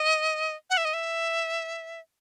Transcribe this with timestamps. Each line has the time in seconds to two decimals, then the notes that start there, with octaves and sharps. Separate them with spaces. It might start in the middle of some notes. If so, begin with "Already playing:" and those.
Already playing: D#5
0.70 F#5
0.77 E5
0.85 D#5
0.94 E5